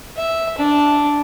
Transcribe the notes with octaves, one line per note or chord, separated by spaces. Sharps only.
E5
D4